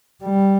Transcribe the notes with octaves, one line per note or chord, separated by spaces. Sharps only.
G3